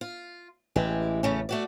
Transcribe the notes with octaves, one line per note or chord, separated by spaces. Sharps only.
F4
A1 E3 G#3 G4
C#3 A3 C#4
A3 F#4 D5